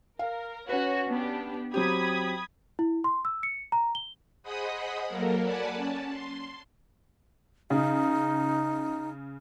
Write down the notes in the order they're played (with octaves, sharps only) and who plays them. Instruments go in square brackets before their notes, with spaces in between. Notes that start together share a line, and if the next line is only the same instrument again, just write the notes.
[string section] A#4 [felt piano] F5
[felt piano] C#4 B4 [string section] F#4 C#5
[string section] B3 D4 G4
[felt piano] F#3 C4 G4 [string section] B5 D#6 G#6
[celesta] E4
C6
E6
C#7
A#5
G7
[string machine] G#4 C5 D#5 F#5 B5 D#6
F#3 A#3 A4 A#4
D5 F#5 G#5 A5 B5
C#4 A5
C6
[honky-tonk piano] C#3 [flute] D#4